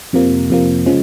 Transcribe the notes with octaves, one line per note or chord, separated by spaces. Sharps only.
F2 C3 F3 A#3
F2 C3 F3 A#3
C#3 F3 G#3